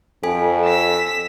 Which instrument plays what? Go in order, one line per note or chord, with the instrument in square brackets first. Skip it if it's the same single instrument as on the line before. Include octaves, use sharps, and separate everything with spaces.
[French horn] F2 [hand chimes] A4 G#5
[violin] E6 B6